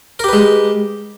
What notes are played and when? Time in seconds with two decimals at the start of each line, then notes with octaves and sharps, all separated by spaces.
0.19 A#4
0.24 G4
0.28 B4
0.33 G#3